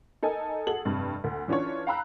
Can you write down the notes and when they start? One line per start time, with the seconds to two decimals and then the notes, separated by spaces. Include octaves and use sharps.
0.22 D#4 A4 A#4 G#5
0.67 F#4 G#4 A4 F#7
0.85 F1 G2 C3
1.24 D2
1.48 E3 C#4 D4 F4 C#5
1.87 F5 G5 A#5 B5 E6 F#6